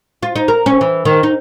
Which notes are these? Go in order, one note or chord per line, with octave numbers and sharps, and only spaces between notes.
F4
D#4
A#4
C#4
E3
D#3
D#4